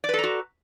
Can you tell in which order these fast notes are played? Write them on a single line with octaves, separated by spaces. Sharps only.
D5 B4 A4 A#5 F#4